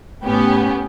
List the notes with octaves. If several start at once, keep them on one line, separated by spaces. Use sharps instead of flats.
A2 B3 C#4 G4